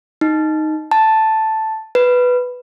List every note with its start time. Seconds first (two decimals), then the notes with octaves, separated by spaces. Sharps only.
0.21 D#4
0.91 A5
1.95 B4